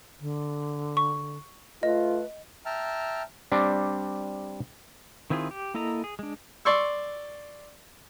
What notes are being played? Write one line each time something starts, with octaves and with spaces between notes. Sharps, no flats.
D3
C#6
A3 F4 B4 D#5
E5 G5 A5 A#5 F6
G3 C4 D4
D#3 C4 E4 F4 G#4
G4
A#3 E4 A4 D#5 A#5
G#4
G#3 D4
D5 C6 C#6 E6